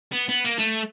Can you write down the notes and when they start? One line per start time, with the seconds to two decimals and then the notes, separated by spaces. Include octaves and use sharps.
0.12 B3
0.29 B3
0.44 A#3
0.58 A3